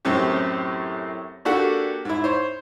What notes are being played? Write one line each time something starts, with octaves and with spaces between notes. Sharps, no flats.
F#2 A2 C4 C#4 G4
A#3 D4 F#4 G4 A4 F#5
G#2 E4
C5 C#5